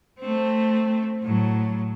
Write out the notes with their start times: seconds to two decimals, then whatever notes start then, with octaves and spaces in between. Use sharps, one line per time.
0.20 A3 C4
1.23 A2 F#3